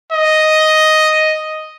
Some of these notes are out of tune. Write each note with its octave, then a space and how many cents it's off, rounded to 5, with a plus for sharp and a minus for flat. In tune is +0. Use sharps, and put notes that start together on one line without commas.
D#5 +0